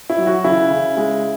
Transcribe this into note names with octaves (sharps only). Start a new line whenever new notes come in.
E4
F#3
F#4
C#3 E4
C#3
G#3